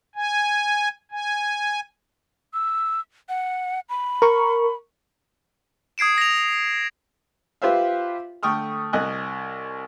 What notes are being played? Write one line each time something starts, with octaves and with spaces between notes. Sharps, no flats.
G#5
G#5
E6
F#5
B5
A#4 C#6
D#6 G#6 C7 D7 E7
A#6 F7
F4 G4 B4 C5 E5 F5
D3 A3 G5 C#6 D#6 F6
C2 D#5 G#5 F#6